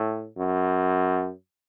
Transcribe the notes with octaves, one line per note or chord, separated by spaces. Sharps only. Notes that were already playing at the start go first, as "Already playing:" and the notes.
Already playing: A2
F#2